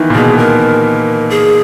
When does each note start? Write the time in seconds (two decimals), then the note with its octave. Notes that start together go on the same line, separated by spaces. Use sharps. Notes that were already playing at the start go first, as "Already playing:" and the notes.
Already playing: D#3 E3 B3
0.10 A#2
0.15 B2 G#4
0.38 A#4
1.30 G#4